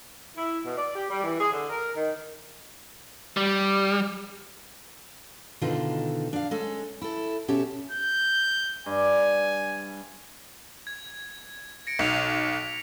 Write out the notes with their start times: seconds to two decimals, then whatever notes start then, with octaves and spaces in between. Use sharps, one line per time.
0.37 E4
0.66 B2
0.77 D5
0.95 G4
1.10 G3
1.24 E3
1.40 G#4
1.52 D3
1.70 A#4
1.97 D#3
3.37 G3
5.61 B2 D3 D#3 F4 A4
6.33 D4 F5
6.51 G#3 C#4 A4
7.02 E4 A4
7.48 B2 C#4 G4 A4 E5 A5
7.91 G6
8.86 G2 G#5
10.87 G#6
11.87 A#6 C#7 D7
11.99 B1 B6 C#7 F7